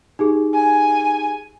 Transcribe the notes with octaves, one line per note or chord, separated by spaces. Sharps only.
D#4 G4 G#4
G#5